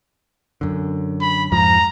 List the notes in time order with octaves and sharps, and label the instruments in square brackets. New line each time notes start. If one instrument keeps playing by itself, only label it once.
[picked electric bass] F#2 D3
[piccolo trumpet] B5
[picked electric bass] F2 G#2 F3 [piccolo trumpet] A#5